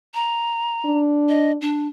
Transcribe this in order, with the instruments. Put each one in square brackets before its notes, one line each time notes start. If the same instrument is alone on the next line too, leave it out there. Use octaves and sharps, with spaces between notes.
[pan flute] A#5
[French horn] D4
[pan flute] D#5
D4